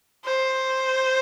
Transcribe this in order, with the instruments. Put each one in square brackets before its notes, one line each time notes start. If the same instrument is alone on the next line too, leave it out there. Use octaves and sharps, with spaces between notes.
[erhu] C5